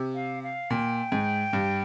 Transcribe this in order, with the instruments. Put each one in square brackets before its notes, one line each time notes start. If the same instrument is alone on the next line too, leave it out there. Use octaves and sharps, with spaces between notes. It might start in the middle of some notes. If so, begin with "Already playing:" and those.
Already playing: [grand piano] C3
[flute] F5
F5
[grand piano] A#2 [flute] G5
[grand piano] G#2
G2